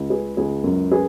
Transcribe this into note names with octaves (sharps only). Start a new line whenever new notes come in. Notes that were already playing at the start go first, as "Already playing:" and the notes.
Already playing: C#2
C#3 G#4 B4
C#2 G#4
F#2
G#4 B4